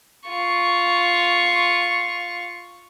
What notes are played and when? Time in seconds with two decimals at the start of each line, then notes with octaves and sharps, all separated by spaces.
0.29 F4 C#6